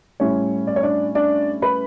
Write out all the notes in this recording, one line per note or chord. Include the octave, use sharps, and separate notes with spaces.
A2 G3 C#4 E4 C#5
D5
C#5
D4 D5
D4 D5
B4 B5